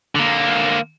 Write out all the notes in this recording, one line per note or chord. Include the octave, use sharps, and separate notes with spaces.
D3 A#3